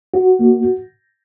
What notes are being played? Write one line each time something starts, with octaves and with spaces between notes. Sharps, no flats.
F#4
A#3